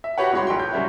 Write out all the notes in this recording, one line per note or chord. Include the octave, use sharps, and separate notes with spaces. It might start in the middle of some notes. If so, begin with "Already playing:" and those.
E5
F#4 G4 B4 C#5 F#5
C2 G#3 F#4 C#5 B5 C6
A#1 G5 C6
G6
C#3 F#3 G3 C#4 E4